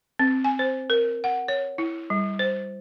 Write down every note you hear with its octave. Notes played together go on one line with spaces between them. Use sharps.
C4
G#5
C5
A#4
F#5
C#5
E4
G3
C5